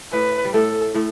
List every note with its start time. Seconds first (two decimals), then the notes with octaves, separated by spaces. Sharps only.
0.12 A2 A3 B4
0.45 G3
0.54 A2 A3 A4
0.94 A2 A3